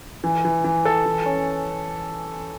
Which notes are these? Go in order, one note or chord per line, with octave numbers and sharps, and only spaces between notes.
E3
E3
E3
A4
E3
C#4